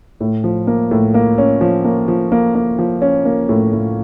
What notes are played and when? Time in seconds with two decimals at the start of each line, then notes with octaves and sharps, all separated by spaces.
0.21 A2
0.44 F3
0.67 A#3
0.91 A2
1.14 A#3
1.38 C#4
1.61 F3
1.84 A#3
2.08 F3
2.32 A#3
2.55 A#3
2.79 F3
3.02 C#4
3.25 A#3
3.49 A2
3.73 A2